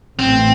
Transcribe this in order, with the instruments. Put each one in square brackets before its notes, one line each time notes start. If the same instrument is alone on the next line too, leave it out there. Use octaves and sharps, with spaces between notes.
[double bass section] A1 A2 E3 [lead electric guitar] C4